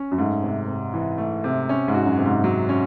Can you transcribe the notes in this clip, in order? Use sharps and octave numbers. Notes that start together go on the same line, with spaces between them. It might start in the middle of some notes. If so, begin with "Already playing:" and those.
Already playing: C#4
F#2
G#2 A3
C3
C3
E3
A3
C3
C#4
G#2
F#4
F#2
C3
G#2
F#3
C#4